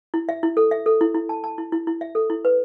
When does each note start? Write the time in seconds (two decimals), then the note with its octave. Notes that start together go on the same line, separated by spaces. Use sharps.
0.14 E4
0.29 E5
0.43 E4
0.57 A4
0.71 E5
0.86 A4
1.01 E4
1.14 E4
1.29 A5
1.44 A5
1.58 E4
1.72 E4
1.87 E4
2.01 E5
2.15 A4
2.30 E4
2.45 B4